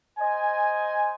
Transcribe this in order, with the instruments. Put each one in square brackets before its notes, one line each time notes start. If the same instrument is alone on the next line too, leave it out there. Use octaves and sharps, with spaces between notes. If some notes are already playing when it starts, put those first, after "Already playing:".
[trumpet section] C5 D#5 G#5